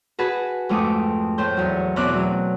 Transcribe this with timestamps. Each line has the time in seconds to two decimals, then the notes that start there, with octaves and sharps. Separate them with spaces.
0.19 F#4 G#4 B4 A5
0.69 F2 G#2 A3 D6 D#6
1.38 A2 C5 G6
1.57 E2 F#3
1.96 E2 B2 C4 C#4 D5 F#6
2.14 F#3